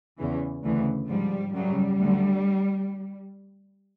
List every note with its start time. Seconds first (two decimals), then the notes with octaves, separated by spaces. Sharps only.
0.19 E2 C#3 E3
0.64 D2 C#3 E3
1.09 G#2 F3 G3
1.54 F#2 C#3 F#3 G3
2.00 D2 D3 F#3